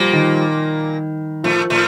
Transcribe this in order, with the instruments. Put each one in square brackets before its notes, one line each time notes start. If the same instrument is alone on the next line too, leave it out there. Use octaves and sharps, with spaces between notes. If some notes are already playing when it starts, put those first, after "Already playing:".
Already playing: [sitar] A#2 A#3 [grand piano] F3 G3
[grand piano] D#3
[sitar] A2 A3 [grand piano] F3
[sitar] A2 A3